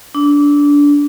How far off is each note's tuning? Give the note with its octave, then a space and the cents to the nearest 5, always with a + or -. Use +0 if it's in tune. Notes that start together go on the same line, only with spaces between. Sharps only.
D4 -20